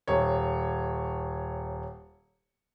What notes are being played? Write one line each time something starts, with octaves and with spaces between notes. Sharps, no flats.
D#1 C#5